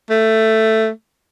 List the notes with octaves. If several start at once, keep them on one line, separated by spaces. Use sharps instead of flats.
A3